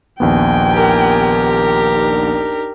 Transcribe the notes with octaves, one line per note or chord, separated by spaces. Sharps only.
A#1 D#2 B3 G5 G#5
G4 A#4
D4 D#4